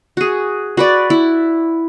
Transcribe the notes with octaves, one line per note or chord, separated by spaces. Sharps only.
F#4 G#4
F#4 B4 D5
E4